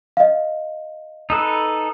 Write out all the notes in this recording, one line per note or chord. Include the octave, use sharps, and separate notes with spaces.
D#5 F5
D#4 A4 B4